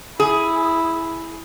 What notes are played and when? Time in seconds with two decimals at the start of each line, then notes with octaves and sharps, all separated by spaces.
0.20 E4 G#4